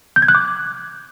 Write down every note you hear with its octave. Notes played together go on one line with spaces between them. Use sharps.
G6
G#6
F#6
D6